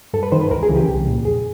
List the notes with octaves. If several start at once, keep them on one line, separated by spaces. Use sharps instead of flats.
G2 A4
B4
D#3 C5
B4
C#2 A#4
G#4
C#3 E3
G4
C2
A#2
F2 G#4